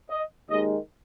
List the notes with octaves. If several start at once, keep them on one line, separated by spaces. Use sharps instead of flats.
D#5
D#2 D#3 G#3 D#5